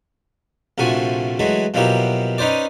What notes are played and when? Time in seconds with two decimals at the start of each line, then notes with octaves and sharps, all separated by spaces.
0.78 A#1 C3 F3 A3 F#4 G#5
1.39 E3 F#3 G#3 A3
1.74 B2 F3 F#3 A#3 E4 G4
2.38 C#4 D#4 B4 C5 D5